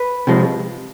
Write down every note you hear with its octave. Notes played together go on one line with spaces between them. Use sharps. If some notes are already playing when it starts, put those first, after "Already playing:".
Already playing: B4
C3 F3 G#3